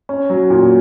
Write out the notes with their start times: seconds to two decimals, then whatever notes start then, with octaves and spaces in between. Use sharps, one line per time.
0.09 C#4
0.30 F#3
0.50 A#2